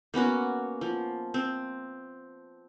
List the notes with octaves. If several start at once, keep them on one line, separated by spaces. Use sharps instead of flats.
A#3 B3 C#4 F#4
F3
C4